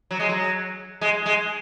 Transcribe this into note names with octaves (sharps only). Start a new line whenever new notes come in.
F#3
G#3
F#3
G#3
G#3